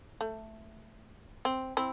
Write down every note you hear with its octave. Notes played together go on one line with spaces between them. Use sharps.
A3
C4
C4 E4